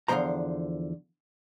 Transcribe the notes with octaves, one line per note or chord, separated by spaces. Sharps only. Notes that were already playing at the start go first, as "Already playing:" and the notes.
E2 D3 D#3 F3 C5 A#5